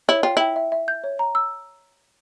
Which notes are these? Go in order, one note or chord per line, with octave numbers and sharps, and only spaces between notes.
E4 C#5
F4 G5
E4 G5
E5
E5
G6
C#5
A#5
E6